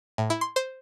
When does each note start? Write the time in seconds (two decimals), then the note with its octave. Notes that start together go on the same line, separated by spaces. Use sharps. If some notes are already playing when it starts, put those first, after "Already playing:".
0.18 A2
0.30 E4
0.41 C6
0.56 C5